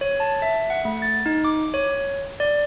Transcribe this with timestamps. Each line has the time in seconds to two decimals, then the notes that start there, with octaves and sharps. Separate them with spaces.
0.01 C#5
0.20 A5
0.42 E5
0.70 F#5
0.85 A3
1.02 A6
1.26 D#4
1.45 D6
1.74 C#5
2.40 D5